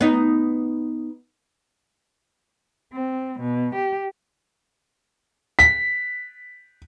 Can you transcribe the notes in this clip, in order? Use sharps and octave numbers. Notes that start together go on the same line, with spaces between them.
B3 D#4
C4
B2
G4
B6